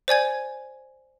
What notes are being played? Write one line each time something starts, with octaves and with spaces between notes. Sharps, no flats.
C5 D5 G#5 G#6